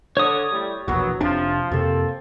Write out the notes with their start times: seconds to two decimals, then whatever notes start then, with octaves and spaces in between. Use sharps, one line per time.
0.17 D3 C#5 D#6
0.52 A2 G3
0.88 E1 A#1 F#3 B3
1.21 F1 C3 F3 D4
1.72 F2 C3 A#3 C4 A4